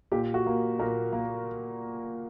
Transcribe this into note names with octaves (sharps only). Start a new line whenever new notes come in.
A#2 G4
F#4
A#3
A#2 A#4
A#3